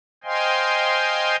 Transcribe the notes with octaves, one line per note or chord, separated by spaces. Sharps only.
C5 D#5 F5 G5 G#5 C6